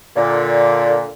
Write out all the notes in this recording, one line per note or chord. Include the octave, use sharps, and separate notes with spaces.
A#2 D3